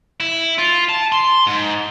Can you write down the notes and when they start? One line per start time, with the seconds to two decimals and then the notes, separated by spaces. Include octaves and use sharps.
0.20 E4
0.58 F4
0.89 A5
1.12 C6
1.47 G#2